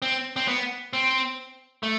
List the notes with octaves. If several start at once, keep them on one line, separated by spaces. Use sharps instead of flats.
C4
C4
B3
C4
A3